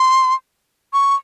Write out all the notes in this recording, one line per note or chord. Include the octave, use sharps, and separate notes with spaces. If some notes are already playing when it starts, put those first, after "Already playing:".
Already playing: C6
C#6